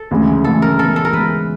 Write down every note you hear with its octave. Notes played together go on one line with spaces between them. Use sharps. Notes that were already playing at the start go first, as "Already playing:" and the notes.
Already playing: A4
D2 C#3 E3 G#3
D2 C#3 E3 G#3 A4
A#4
E3 G#3 B3 A4
A4
A#4
E3 G#3 B3 B4